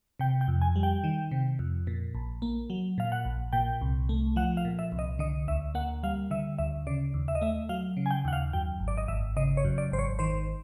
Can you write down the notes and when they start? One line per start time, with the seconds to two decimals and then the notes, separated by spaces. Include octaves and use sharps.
0.19 C3 G5
0.41 G5
0.48 F2
0.62 G#5
0.76 G3
0.83 G5
1.04 D#3
1.31 C3
1.59 F2
1.87 A#2
2.15 A#1
2.42 A#3
2.70 F#3
2.98 A#2 F5
3.12 F#5
3.25 A#1
3.53 A#2 G5
3.81 C2
4.09 A3
4.36 F3 F#5
4.57 F5
4.65 A#2
4.79 E5
4.92 C2
4.99 D#5
5.19 D3 D#5
5.48 D2 E5
5.75 A#3 F#5
6.03 G3 F5
6.31 D3 E5
6.58 D2 E5
6.87 C#3 D5
7.14 D#2
7.28 E5
7.35 D#5
7.41 A3 E5
7.69 F#3 F5
7.97 C#3
8.06 G#5
8.11 G5
8.25 D#2 F#5
8.33 F5
8.53 F#2 G5
8.80 G#1
8.88 D5
8.97 D#5
9.08 G#1 E5
9.36 C#3 D#5
9.57 C#5
9.64 F#2
9.78 D5
9.91 G#1 C5
9.99 C#5
10.19 D#3 C5